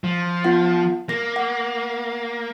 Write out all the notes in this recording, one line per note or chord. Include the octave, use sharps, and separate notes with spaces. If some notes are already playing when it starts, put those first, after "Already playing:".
F3
B3 F4 F#5
A#3 A#6
F#5